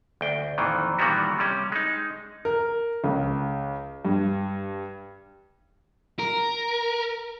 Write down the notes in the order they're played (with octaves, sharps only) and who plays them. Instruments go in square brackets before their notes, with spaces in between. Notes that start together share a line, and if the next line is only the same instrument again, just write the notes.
[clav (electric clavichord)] D2 G5
F2 A#2 D#3 E3
A#2 D#3 E3 G3 B3 F#4
C3 G3 C#4
G#3 D#4
[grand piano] A#4
C#2
G2
[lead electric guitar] A#4